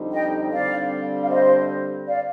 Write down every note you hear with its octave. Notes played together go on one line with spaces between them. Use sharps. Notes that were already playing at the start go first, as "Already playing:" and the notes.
Already playing: F2 D3 G3 C4 D#4
D#5 G5
D3 G3 C4 D5 F5
F5
C5 D#5
D5 F5